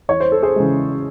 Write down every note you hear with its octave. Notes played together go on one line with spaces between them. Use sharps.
E2 C#5
C5
A4
G#4 C5
C#3 E3 G#3